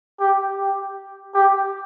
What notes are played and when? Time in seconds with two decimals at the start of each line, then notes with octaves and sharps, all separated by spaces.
0.20 G4
0.58 G4
1.34 G4